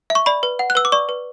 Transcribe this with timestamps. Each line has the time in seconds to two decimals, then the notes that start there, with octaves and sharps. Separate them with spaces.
0.10 E5
0.15 C#6
0.26 D5 B5
0.43 B4
0.59 F#5
0.70 F#6
0.75 B4 E6
0.85 D6
0.92 D5 C#6
1.09 B4